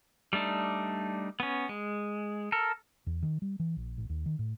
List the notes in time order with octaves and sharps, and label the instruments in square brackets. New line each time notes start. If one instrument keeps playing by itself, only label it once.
[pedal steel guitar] G3 A3 D4 D#4
B3 C#4
G#3
A4 A#4
[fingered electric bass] E2
D#3
G3
E3
A#1
A1
D#2
D#3
A2